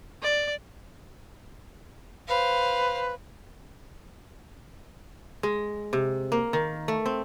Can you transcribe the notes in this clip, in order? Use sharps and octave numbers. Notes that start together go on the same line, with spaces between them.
D5
B4 C5 F5
G#3
C3
A#3
D#3
A3
C4